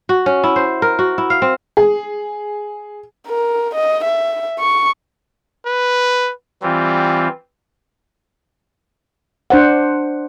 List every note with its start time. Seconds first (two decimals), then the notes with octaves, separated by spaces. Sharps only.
0.09 F#4
0.26 C#4
0.44 E4
0.56 C5
0.82 A#4
0.99 F#4
1.18 E4
1.30 F5
1.42 C4
1.77 G#4
3.27 A#4
3.75 D#5
4.05 E5
4.60 C#6
5.66 B4
6.63 E3 G3 C4 F4
9.50 D4 C5 F#5